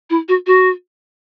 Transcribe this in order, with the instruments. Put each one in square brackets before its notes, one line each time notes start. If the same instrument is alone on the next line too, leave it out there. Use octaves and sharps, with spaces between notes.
[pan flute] E4
F#4
F#4